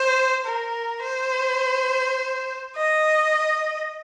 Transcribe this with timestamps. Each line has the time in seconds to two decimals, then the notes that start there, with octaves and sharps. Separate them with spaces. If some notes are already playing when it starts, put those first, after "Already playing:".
Already playing: C5
0.46 A#4
1.03 C5
2.77 D#5